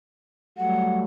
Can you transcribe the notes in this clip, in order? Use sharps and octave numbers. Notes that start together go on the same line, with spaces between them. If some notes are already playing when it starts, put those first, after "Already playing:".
F#3 G3 A3 F#5